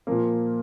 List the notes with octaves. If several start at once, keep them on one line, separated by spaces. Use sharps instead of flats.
A#2 F3 A#3